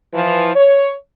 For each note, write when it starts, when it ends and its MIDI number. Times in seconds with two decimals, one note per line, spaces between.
0.13 0.52 52
0.13 0.52 53
0.55 0.92 73